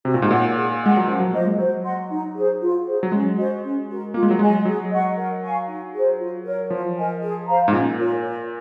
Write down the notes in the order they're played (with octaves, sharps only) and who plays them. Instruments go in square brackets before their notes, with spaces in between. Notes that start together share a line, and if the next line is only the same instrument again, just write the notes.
[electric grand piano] C3 [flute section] F#4
[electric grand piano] A#2
G#2
[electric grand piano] A#2 [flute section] C#5 F#5
[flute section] G#4
[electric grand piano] G#3 [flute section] D#5 F#5
[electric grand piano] F#3
[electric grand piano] F3 [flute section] C#4
[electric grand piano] F#3
[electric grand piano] A#3 [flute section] F4 C5 D#5
[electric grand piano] G#3
[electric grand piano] F#3 [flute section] C5
[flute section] D#5 F#5 C6
D#4
G#4 C5
F4
G#4 C5
[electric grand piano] F#3
[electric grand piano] G#3 [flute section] C#4
[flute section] F#4 C5 D#5
C#4
F#4 A#4
[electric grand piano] A#3 [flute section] F4
[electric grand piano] G#3
F#3
[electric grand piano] G#3 [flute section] G#4 D#5 G#5
[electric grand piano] F#3 [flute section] G#4
[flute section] D#5 F#5 C#6
A#4
F5 G#5 C#6
D#4
G#4 C5
F4
A#4 C#5
[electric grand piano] F3 [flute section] F4
[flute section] A#4 D#5 G#5
G#4
C5 F5 A#5
[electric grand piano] G#2
[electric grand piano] A#2 [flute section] C#4
[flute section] F4 A#4 C#5
A#4